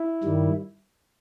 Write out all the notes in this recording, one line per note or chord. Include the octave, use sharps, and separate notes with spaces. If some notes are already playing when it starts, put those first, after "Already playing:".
Already playing: E4
G2 D#3 G3